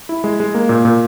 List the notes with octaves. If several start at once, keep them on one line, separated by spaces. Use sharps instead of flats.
E4
G#3
G#3
A#3
A#2
A#2